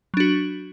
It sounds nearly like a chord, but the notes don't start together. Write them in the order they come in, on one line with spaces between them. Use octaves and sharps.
F#3 D4 F#4